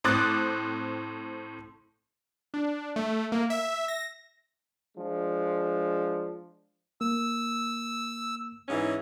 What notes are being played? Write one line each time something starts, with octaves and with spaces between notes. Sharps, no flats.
A2 C4 D6 D#6 F#6 A6
D4
A3
A#3
E5
A#6
F3 G#3 D4
A#3 E6
G#2 E3 C#4